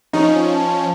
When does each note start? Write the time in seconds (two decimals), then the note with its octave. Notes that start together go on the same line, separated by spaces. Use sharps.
0.13 F3 C#4 D#4
0.52 A5